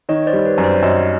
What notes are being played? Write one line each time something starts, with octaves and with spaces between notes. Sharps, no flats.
D#3 C#5 D#5
C5 D5
G3
B4 C#5
F#2
C5 D5
F#2 C#5 D#5